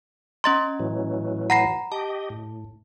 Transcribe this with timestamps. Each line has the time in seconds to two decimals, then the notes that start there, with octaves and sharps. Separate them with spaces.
0.44 C#4 D#5 A#5 C6 A6 F#7
0.79 A2 E3 F#3
1.50 F#5 A#5 B5 A#6 C7
1.92 G4 D#5 A5
2.30 A2